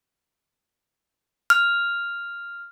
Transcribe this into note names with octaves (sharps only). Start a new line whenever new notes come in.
F6